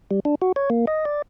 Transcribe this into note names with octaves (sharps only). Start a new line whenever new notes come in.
G3
D4
F#4
C#5
A#3
D#5
D5